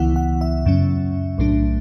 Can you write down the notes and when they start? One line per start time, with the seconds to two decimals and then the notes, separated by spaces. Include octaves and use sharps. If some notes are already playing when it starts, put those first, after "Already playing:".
Already playing: C#2 C#3 E3 B3 E4 F#5
0.16 F#5
0.41 E5
0.66 F#2 C#3 F#3 C#4
1.38 B1 A2 F#3 A3 D4